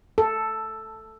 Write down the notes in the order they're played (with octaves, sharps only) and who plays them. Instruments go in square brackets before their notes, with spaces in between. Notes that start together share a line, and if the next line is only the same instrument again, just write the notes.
[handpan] A4